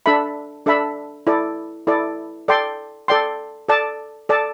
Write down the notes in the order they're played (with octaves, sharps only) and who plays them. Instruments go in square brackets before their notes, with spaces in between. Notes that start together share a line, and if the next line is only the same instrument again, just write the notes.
[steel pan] D4 A4 E5 B5
D4 A4 E5 B5
E4 A4 D5
E4 A4 D5
A4 D5 G5 C6
A4 D5 G5 C6
A4 D5 A5
A4 D5 A5